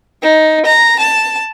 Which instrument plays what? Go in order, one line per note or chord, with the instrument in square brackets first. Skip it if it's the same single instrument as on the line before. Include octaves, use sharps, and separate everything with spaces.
[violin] D#4
A#5
A5